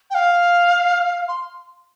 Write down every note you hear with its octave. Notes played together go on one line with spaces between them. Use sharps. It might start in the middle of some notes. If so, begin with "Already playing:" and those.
G5
F5
C6